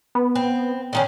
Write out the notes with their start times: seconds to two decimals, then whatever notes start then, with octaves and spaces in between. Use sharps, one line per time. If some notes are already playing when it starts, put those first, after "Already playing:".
0.15 B3
0.35 C4
0.93 D3 D#3 C#4